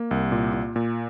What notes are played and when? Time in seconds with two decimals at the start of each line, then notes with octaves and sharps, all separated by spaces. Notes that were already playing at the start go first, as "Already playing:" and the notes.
Already playing: A#3
0.11 C2
0.32 A#2
0.54 A#2
0.76 A#2